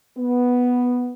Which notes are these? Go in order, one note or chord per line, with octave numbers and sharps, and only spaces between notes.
B3